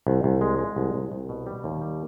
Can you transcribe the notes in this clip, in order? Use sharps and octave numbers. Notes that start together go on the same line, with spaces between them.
C2
C2
G#3
G#3
C2
C2
C2
B2
G3
D#2
G3